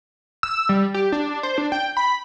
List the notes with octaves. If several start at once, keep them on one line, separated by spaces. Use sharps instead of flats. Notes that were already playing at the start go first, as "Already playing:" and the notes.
E6
G3
G4
D4
C5
D4
G5
B5